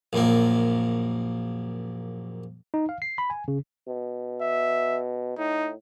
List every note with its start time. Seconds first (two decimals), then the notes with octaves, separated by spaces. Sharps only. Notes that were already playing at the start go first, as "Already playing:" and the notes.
0.13 A#1 F#2 A#3
2.74 D#4
2.89 F5
3.02 C7
3.18 B5
3.30 G#5
3.48 C#3
3.88 B2
4.41 E5
5.38 A2 D#4